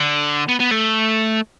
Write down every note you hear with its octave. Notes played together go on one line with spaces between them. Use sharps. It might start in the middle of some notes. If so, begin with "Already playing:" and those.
Already playing: D3
B3
B3
A3